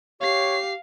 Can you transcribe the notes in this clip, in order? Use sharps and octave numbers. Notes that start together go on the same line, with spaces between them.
G4 C#5 F5 C7